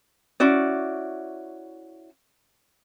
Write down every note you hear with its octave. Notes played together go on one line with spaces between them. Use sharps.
C#4 E4 F#4 D5